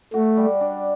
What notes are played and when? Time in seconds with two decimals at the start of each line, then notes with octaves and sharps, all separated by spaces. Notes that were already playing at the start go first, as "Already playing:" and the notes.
0.14 A3 F#4
0.37 G3
0.61 D4